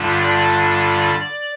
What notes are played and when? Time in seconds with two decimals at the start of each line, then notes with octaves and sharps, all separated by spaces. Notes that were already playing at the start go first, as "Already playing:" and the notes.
Already playing: G2 D3 G3 D4 F4
0.18 D5